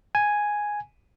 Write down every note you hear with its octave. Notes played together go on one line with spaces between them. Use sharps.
G#5